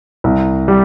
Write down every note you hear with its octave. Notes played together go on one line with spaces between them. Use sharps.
C2
G3